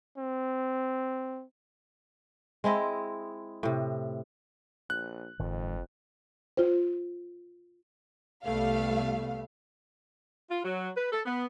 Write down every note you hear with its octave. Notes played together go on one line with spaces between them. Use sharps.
C4
G#3 C4 E4 D#5
A2 C3
A#1 F#6
F#1 F2 G#2 D#3 G#3
F4 C5
C2 G3 A3 B3 F5
F4
F#3
B4
A4
B3